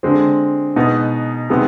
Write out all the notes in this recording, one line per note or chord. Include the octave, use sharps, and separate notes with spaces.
D3 G#3 C4
B2 G#3 B3 D#4
C3 D#3 G#3 B3